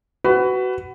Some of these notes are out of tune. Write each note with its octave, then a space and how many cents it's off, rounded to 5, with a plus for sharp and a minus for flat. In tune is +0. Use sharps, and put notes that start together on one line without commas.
F#4 +20 B4 +15